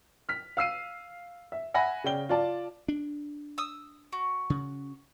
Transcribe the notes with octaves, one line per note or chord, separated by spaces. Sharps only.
F6 B6
F5 E6 C7 D#7
E5
E5 F#5 G#5 B5 A#6
C#3 D5 G5 G7
F4 D5 A5
D4
D#6 E6
F#4
C#3